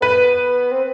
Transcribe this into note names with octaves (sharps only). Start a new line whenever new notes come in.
B3 B4
C4